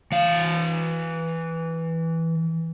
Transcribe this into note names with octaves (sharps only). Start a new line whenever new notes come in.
E3 F5